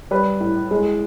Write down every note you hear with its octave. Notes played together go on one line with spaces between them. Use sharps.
G3 B4
A2
G#3